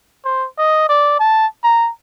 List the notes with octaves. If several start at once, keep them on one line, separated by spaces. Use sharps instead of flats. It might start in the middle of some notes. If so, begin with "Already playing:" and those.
C5
D#5
D5
A5
A#5